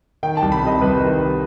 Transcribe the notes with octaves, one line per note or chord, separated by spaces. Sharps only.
D#3 G5
A5
C2
B5
C3 D#5
C2 B4
D#3
C2